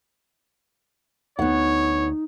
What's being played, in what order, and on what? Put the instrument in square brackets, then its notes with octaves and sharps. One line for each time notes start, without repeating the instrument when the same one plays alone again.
[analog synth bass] D2 [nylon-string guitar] B3 F#5 [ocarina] D#4 [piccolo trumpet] C#5